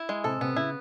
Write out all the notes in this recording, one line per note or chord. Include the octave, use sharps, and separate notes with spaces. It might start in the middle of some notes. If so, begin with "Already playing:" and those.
Already playing: E4
G#3
C3 A4
C3 B3
C#3 E4